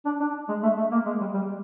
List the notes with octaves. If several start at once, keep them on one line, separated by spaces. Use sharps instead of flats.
D4
D4
G#3
A3
A3
A#3
G#3
G3
G3